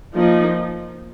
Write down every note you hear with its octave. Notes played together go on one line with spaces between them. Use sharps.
F3 A#3 D#4